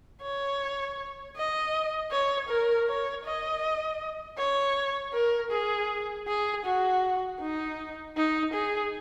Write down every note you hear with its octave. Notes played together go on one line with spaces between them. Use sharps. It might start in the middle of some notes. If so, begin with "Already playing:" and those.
C#5
D#5
C#5
A#4
C#5
D#5
C#5
A#4
G#4
G#4
F#4
D#4
D#4
G#4